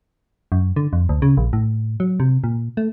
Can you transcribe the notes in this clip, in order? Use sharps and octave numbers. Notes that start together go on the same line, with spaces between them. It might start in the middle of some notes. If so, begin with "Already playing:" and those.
F#2
D3
F2
D2
C#3
A#1
A2
F#3
C3
A#2
A3